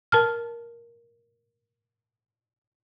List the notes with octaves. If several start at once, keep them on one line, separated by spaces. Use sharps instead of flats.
A#4 A5 F6